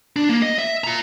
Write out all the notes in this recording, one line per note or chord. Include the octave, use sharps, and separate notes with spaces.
D4
A#3
D#5
E5
F4 A#5